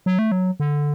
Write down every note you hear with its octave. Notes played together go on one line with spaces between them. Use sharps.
F#3
A3
F#3
D3